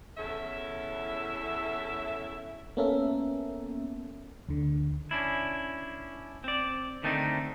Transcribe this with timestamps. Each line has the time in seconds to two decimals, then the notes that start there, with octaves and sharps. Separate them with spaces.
0.17 E2 C#4 E4 A4 E5
2.77 A#3 B3 C#4 A4 A#4 E5
4.49 D2 D3
5.11 C#4 D4 E4
6.44 C4 D5
7.03 D3 D#3 A3 C4 D4 D#4